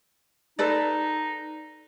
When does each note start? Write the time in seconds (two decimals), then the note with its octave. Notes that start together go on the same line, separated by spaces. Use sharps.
0.59 D#4 A4 B4 D5